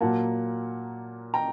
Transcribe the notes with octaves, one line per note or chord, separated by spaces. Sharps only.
A#2 F#3 A#3 F#5 A5
G5 A#5